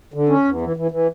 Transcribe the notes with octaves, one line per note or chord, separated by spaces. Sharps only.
D3
C#4
E2
E3
E3
E3